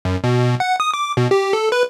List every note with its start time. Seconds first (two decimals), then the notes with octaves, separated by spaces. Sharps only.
0.05 F#2
0.24 B2
0.60 F#5
0.80 D#6
0.94 D6
1.17 B2
1.31 G4
1.53 A4
1.72 B4